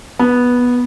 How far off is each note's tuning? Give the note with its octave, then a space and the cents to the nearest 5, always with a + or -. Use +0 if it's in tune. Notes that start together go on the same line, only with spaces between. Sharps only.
B3 -10